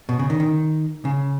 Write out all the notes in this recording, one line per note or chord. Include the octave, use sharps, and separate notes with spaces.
B2
C#3
D#3
D#3
C#3